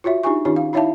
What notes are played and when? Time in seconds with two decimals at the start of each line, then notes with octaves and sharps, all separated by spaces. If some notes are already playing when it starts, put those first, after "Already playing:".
0.04 F4 F#4 C#5 E5
0.23 D4 D#4 F4 G4 G#5 C#6
0.45 D#3 C#4 D#4 F4 G4 C#5
0.56 F5
0.73 D#4 E4 C#5 E5 F5 A5